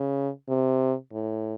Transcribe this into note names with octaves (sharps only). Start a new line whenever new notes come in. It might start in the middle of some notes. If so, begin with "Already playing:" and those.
Already playing: C#3
C3
A2